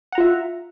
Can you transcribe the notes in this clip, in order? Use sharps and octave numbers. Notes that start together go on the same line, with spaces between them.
F4 E5 F#5 A#5